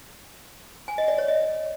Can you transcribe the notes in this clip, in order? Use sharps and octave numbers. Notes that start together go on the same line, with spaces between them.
G#5
D#5
D5
C#5
D#5